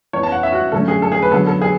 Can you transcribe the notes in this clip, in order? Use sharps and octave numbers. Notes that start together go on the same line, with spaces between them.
E3 B3 C#5
A5
F#5
E5
F#4
D3 F#3 A3 C#4 A4
G#4
A4
G#4
B4
D3 F#3 B3 A4
A4
G#4